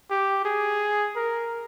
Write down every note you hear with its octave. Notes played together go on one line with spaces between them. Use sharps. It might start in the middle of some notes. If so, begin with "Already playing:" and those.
G4
G#4
A#4